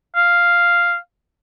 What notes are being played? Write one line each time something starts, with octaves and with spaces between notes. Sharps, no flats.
F5